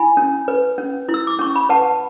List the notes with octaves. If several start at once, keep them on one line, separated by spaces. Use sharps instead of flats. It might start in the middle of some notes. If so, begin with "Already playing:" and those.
Already playing: E4 G#5 B5
C#4
B4
C#4
E4
E6
D6
C#4 C#6
B5
B4 F#5 A5